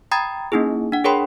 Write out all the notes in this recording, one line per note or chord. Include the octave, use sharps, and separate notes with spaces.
G5 A#5 B5 D#6 G#6 A6
A#3 C#4 D#4 E4 G#4
D4 F#5
G#4 A#4 C#5 G5 B5 C6